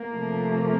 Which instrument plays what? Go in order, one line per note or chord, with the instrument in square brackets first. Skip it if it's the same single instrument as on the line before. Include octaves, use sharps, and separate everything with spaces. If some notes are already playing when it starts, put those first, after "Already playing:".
Already playing: [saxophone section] A#3
[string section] C3 F3 A3